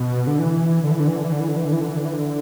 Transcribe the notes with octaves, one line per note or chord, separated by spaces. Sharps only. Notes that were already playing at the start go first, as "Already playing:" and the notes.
Already playing: B2
D3
E3
D3
E3
D3
E3
D3
E3
D3
E3
D3
E3
D3
E3
D3
E3
D3
E3
D3